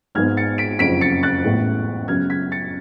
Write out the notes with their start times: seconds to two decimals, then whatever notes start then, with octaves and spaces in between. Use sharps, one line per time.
0.15 G#1 G#2 G#3 B3 F6 G#6
0.37 A6 C#7
0.58 B6 D7
0.79 F#1 F2 C#3 F3 B6 D7
1.01 A6 C#7
1.23 F#6 A6
1.44 A1 A2 G#3 B3
2.08 F#2 C#3 F#3 B3 F6 G#6
2.30 G#6 B6
2.52 A6 C#7